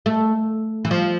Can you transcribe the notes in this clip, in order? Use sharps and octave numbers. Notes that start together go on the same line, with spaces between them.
A3
E3
F3